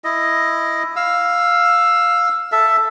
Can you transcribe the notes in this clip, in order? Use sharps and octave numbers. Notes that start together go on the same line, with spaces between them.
E4 D#5
F5 E6
A4 E5